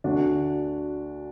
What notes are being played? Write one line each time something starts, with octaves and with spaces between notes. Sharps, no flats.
D2 D3 D4 F#4